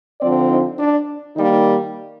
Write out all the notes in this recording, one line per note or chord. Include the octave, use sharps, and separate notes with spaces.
D3 F3 C4 D5
D#4
D4
D#3 G3 A#3 D#4